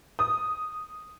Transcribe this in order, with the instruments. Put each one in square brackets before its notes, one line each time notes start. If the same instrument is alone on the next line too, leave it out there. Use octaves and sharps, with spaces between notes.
[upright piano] D#6